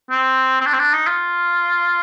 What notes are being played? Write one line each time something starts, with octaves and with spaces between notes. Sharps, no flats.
C4
C4
D4
C4
D4
D#4
F4